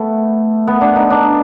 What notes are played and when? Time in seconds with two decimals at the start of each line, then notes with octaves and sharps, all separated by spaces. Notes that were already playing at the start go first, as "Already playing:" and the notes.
Already playing: A3 B3
0.67 B3
0.81 D4
0.96 D#4
1.10 D4